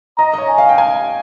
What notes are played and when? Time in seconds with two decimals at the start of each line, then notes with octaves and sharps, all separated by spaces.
0.18 D#5 A#5
0.34 D#5
0.38 C#5
0.49 G#5
0.58 F5
0.69 G5
0.78 G#5